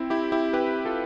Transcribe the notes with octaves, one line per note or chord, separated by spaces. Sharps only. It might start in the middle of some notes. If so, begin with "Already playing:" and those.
Already playing: C4 E4
E4 G4
E4 G4
G4 B4
F4 A4